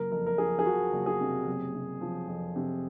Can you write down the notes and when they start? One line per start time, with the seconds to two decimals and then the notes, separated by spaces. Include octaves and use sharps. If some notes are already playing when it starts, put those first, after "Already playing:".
Already playing: F#1 A#4
0.12 F2 A#4
0.26 A#4
0.38 F3 G#4
0.59 G#4
0.65 F3 F#4
0.93 F#1
1.06 G#4
1.20 C3
1.47 F#1
1.74 C3
2.01 F3
2.28 F2
2.56 C3